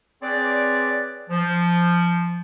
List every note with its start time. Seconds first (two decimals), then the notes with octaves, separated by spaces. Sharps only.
0.22 C4 G#4 B4 C#5 D5
1.29 F3